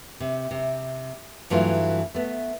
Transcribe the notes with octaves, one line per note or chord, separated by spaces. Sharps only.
C3
C3
G2 E3 F#3 A3 F4
A3 B3